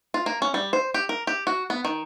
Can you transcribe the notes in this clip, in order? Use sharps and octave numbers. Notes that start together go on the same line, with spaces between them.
F4
A#3
C#4
G3
C5
G4
A#4
G4
F#4
B3
D#3